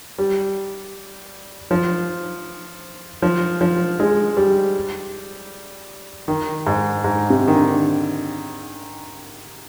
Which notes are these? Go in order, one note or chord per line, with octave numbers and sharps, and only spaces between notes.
G3
F3
F3
F3
G#3
G3
D#3
G#2
G#2
C3
D#3
D3